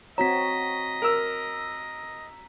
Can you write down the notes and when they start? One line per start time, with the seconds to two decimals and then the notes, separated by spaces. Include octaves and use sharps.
0.18 C4 F#4 C#5 D#5 A#5 B6
1.02 A#4 E6